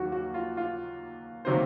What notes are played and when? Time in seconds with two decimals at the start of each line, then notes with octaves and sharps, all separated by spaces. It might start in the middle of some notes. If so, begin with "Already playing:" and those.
Already playing: D#2 D#3 F#3 A#3 F#4
0.12 F#4
0.34 F4
0.57 F4
1.45 C3 D#3 F#3 A#3 C5